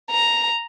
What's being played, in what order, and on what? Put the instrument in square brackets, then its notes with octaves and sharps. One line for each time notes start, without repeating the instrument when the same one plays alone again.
[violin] A#5